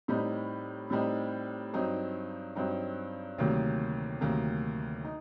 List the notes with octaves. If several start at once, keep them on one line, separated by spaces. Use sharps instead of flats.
A2 G3 C4 D#4
A2 G3 C4 D#4
G2 F#3 C4 D#4
G2 F#3 C4 D#4
D2 C3 D#3 F#3 A#3
D2 C3 D#3 F#3 A#3
D#4